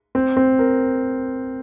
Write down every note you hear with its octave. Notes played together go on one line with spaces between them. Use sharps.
C4
C4
A#4